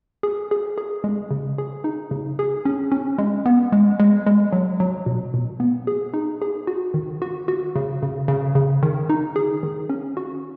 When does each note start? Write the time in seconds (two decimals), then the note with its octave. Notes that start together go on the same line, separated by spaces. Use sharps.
0.23 G#4
0.51 G#4
0.78 G#4
1.04 G#3
1.31 C#3
1.58 G#4
1.84 D#4
2.11 C#3
2.39 G#4
2.65 C#4
2.92 C#4
3.18 G#3
3.46 B3
3.72 G#3
4.00 G#3
4.26 G#3
4.53 F#3
4.80 F#3
5.06 B2
5.34 B2
5.60 B3
5.87 G#4
6.14 D#4
6.42 G#4
6.67 F#4
6.94 D#3
7.22 F#4
7.48 F#4
7.76 C#3
8.02 C#3
8.28 C#3
8.55 C#3
8.83 D#3
9.10 D#4
9.36 G#4
9.63 D#3
9.89 C#4
10.17 F#4